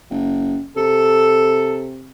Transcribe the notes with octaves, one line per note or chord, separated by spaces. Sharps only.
F#1
C3 A4